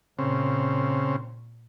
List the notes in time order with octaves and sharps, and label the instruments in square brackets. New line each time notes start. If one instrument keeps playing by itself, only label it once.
[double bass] A#2 [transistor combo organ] C#3 C4